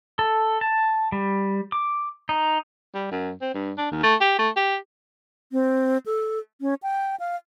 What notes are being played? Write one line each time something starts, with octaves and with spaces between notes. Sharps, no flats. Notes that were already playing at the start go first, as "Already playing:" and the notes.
A4
A5
G3
D6
D#4
G3
F#2
C4
G2
D4
D#2
A3
G4
A3
G4
C4
A4
C#4
G5
F5